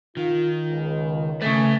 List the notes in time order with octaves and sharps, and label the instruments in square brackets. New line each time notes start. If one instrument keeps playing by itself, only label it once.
[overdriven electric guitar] D#3 [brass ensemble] F4
[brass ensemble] C#2
[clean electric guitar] C#3 A3 [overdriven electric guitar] B4 G#5